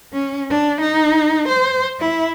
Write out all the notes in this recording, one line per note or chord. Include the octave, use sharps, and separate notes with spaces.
C#4
D4
D#4
C5
E4